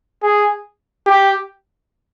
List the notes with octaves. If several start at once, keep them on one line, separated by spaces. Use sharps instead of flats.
G#4
G4